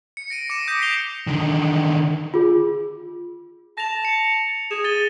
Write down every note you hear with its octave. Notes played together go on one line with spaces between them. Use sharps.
C#7
A#6 D7 D#7
D6 A#6 C#7 E7
D#6 G6 A#6 B6 D7
D6 B6 C7 D7 F7 G7
D3 D#3
F4 G#4
A5 A#6 F7
C#7
G#4 E7
A6 D#7 G7